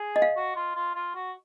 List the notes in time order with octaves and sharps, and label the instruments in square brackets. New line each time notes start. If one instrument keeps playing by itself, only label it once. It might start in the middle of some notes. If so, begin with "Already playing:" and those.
Already playing: [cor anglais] G#4
[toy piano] D#5
F5
[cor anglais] F#4
F4
F4
F4
F#4